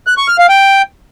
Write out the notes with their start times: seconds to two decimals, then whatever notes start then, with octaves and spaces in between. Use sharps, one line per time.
0.07 F#6
0.18 C#6
0.28 F6
0.39 F5
0.49 G5